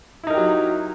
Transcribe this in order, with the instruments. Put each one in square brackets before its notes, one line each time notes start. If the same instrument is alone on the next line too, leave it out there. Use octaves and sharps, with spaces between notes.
[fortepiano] E4
D#4
A#4
G4
F#3